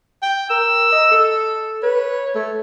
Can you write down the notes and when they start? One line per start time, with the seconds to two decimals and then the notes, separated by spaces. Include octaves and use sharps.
0.22 G5
0.50 A#4 E6
0.92 D#5
1.12 A4
1.83 B4 C#5
2.35 A3